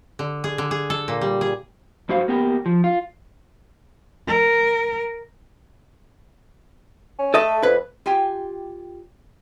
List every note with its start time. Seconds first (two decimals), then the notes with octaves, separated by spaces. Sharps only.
0.19 D3
0.44 G#4
0.58 D3
0.71 G#4
0.90 A4
1.08 A#2
1.21 G3
1.41 G#4
2.09 G2 F#3 F#4 C5 F5
2.28 A#3 B3 G4
2.66 F3
2.84 F4
4.28 A#4
7.18 C#4
7.34 A3 A4 D#5 A5
7.63 F2 B4
8.06 F4 G4 G5 G#5